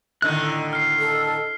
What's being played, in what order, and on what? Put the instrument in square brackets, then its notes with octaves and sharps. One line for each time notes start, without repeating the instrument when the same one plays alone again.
[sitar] A2 D3 D#3 [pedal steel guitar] D#5 F#6
[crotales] F6 C7
[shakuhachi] A4